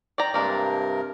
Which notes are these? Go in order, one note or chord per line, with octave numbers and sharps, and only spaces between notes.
D5 G5 A#5
G2 C3 G#3 A#3 D4 A#4